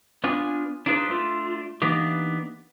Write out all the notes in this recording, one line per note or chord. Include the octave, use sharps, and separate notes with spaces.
B3 D4 F4 G#5
D4 D#4 F4 G#4 B4 C5
A3 D4 F4
E3 A#3 B3 D4 D#4 G4